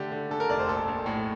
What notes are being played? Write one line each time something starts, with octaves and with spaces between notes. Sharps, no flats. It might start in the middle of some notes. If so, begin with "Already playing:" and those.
Already playing: D3 A3 G4
D3
D3 A4
A#4
F1 D5
C5
A#1 A4
A#1
A2